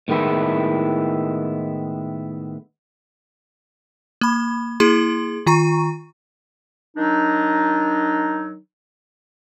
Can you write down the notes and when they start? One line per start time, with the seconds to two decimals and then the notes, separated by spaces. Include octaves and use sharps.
0.08 A2 D#3 G#3 B3 E4
4.21 A#3 B5
4.80 A#3 E4 G#4 C6
5.46 D#3 F4 A#5 C#6
6.97 D#3 F#3 D4 D#4